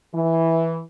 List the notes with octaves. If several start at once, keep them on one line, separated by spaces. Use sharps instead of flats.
E3